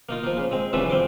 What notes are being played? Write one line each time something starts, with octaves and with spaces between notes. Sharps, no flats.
A#3 D#4 F4
F3 A#3
C#3
G#3 C4
C2 C#3 E3 F3 D4 E5
F2 C4 C6 D6